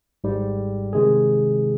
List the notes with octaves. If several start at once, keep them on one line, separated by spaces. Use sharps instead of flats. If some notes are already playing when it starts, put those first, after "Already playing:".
G#1 G#2 G3
C3 D#3 G#3 D#4 G#4